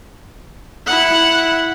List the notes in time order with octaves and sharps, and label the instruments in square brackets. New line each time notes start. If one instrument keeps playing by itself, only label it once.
[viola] E4 F#5